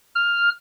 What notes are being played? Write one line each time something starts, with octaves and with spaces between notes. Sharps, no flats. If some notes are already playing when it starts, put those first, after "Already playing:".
F6